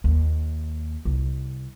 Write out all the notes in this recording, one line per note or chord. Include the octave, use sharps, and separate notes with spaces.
D#2
C2